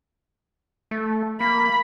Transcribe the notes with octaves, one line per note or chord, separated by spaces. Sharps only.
A3
A#3 B5